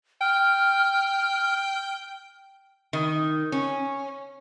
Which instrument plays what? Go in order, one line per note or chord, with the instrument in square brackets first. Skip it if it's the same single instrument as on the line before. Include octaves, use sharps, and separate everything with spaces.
[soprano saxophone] G5 [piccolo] F6
[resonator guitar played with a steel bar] D#3
C#4